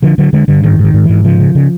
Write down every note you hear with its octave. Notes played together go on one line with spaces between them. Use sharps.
D3 F3
D3 F#3
D3 G#3
G2 D3
G#2 D#3
G#2 D#3
G#2
G#2 E3
C#3 F3
C#3
C#3